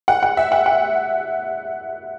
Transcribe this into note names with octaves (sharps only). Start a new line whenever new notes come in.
F#5
F#5
E5
F#5
F#5